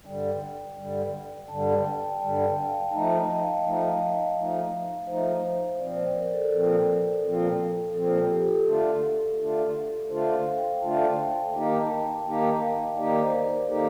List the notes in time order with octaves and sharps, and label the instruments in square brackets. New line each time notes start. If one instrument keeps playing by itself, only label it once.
[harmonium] G2 D3 G3 [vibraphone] G5
[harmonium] G2 D3 G3
[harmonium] G2 D3 G3 [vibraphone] A5
[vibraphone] G5
[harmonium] G2 D3 G3 [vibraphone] A5
[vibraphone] G5
F5
[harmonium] F3 A3 D#4 [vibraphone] A5
[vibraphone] G5
D#5
F5
[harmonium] F3 A3 D#4 [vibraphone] F5
[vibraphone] D#5
F5
[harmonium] F3 A3 D#4
[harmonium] F3 A3 D#4 [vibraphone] C5
[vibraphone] C5
[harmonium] A#2 F3 C4 [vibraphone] D5
[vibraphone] D5
C5
A#4
A4
[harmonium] A#2 F3 C4 [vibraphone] A4
[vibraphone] A4
[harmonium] A#2 F3 C4
[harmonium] A#2 F3 C4 [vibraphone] A4
[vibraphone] F4
G4
A4
[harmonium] D3 A3 D4 F4 [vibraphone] A4
[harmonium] D3 A3 D4 F4
[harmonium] D3 A3 D4 F4 [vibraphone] C5
[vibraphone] F5
G5
[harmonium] D3 A3 D4 F4 [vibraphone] A5
[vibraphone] G5
G5
[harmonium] D#3 A#3 D#4 G4 [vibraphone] G5
[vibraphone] A5
G5
[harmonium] D#3 A#3 D#4 G4
[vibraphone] F5
D#5
[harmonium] D#3 A#3 D#4 G4 [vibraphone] D5
[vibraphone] C5
A#4
[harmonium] D#3 A#3 D#4 G4 [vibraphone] A4